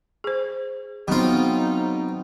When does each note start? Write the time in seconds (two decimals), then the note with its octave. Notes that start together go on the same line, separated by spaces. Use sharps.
0.24 G#4 C5
1.08 B2 F#3 G#3 C4 D#4 F4